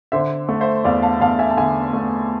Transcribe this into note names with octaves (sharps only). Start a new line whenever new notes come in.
D3 C5 E5
A3
C5 E5
E2 D5 F5
F5 A5
E2 F5 A5
E5 G#5
A5
D3 E5 G#5
A3